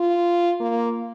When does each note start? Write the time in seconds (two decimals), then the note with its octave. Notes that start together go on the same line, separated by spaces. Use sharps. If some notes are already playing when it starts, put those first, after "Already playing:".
Already playing: F4
0.60 A#3